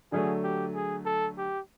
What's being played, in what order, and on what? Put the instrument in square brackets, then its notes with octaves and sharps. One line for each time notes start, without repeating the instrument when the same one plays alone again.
[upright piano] D3 F#3 A3 [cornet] G#4
[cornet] G4
G#4
A4
G4